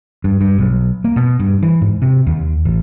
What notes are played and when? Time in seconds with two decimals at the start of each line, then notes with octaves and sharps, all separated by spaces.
0.24 G2
0.41 G2
0.58 B1
1.04 A#3
1.16 B2
1.39 G2
1.62 E3
1.81 G#2
2.02 C3
2.27 D#2
2.65 A1